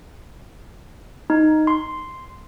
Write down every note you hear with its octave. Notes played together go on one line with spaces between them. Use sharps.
D#4
C6